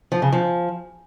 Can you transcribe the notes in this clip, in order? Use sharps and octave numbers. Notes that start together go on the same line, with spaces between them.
F3
C#3
F3